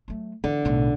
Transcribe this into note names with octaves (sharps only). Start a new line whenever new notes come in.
F#3 A3
D3 E3
B1 A2